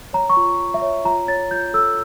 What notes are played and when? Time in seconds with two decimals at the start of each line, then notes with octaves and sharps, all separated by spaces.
0.13 C#5 A#5
0.30 C#6
0.37 F4
0.59 F4
0.74 E5
0.82 C#5
1.05 F4 A#5
1.28 C#5 A6
1.51 F4 G6
1.74 A4 E6